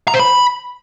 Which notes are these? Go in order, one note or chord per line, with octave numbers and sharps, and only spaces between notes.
A#5
C5
B5